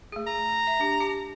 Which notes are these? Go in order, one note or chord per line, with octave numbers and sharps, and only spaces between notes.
A3 G#4
A#5
E5
D4 G4
G4 A5